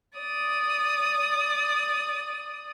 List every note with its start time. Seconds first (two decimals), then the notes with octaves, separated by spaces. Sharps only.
0.18 D5 D#6